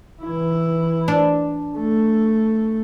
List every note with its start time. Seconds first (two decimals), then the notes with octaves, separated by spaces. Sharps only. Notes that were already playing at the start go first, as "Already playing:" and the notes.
0.23 E3 E4
1.08 D4
1.78 A3